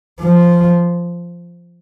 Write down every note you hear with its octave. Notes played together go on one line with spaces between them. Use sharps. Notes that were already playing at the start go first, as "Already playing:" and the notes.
F3